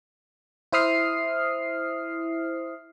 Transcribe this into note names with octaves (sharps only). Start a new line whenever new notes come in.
E4 C5 E5 D#6 F6 C7